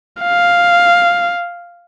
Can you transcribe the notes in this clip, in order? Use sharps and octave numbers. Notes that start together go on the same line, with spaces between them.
F5